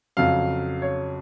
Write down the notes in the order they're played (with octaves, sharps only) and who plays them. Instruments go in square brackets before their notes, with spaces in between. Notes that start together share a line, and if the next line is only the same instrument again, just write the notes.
[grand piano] F2 C#3 F#3 F5
C#5